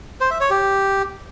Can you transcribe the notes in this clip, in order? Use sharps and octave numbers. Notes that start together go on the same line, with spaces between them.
C5
E5
C#5
G4